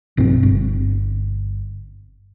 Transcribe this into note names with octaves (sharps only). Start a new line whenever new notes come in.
A#1 G2 B2 C4
G1